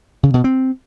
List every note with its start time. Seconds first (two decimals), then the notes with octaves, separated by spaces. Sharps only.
0.23 C#3
0.34 B2
0.44 C4